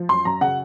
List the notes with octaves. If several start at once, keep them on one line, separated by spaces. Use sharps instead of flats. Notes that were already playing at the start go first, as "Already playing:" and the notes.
Already playing: F3
F#2 C6
F#2 A#5
C#3 F#5